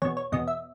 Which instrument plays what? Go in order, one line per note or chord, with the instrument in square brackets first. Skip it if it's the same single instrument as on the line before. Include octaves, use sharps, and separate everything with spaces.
[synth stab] E2 B2 C#5
C#5
E2 B2 D#5
E5